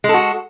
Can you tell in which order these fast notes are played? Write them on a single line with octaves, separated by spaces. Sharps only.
G#3 A4 F#4